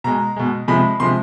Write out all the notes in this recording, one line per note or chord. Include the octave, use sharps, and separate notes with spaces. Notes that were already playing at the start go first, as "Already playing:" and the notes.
B2 G#3 A#5
B2 G#3
C3 F3 G#3 B5
C3 F3 G#3 C6